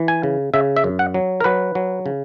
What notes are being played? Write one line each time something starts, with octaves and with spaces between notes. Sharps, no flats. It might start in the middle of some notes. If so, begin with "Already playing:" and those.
Already playing: E3
G#5
C#3
C#3 E5
E5
F#2
F#5
F#3
A#4
F#3 B4
F#3
C#3